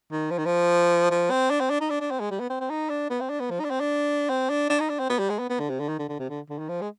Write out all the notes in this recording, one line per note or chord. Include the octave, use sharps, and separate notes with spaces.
D#3
F3
D#3
F3
F3
C4
D4
C4
D4
D#4
D4
D4
C4
G#3
G3
B3
C4
C4
D#4
D4
B3
C4
D4
B3
F3
D#4
D4
C4
D4
C4
D4
D4
D#4
D4
C4
B3
G3
G#3
B3
B3
D3
C3
D3
D#3
D3
D3
C3
D3
D3
D#3
F3
G#3